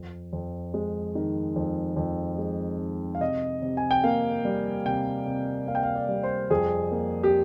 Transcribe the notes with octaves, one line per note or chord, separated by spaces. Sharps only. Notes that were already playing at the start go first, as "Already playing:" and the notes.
Already playing: F2
F2
G#3
D#3
F2
F2
G#3
D#3
F5
C3 D#5
C3
G#5
G5
A#3 F5
G3
C3 G5
C3
A#3 F5
G5
F5
D5
G3
C5
F2 G#4
A#3
G4